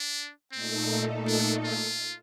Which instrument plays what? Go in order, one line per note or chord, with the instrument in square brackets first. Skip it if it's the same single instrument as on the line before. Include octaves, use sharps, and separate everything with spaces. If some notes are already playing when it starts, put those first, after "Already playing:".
Already playing: [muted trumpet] D4
[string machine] A#2 A3 D#4 A4 [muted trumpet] C4
[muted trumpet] D4
F4